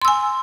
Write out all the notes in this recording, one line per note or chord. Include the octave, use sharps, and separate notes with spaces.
G#5 C6 E6